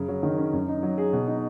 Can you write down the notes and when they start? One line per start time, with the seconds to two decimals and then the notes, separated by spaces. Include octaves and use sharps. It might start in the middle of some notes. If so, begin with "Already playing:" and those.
Already playing: F#2 C#3
0.08 F#3
0.23 D#3
0.38 C#4
0.53 F#2
0.68 D#4
0.83 F#3
0.98 G#4
1.13 B2
1.28 D#4